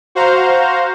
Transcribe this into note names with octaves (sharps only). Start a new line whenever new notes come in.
F#4 C5 F5 A#5